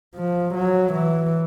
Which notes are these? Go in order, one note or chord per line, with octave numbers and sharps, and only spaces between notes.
F3
F#3
E3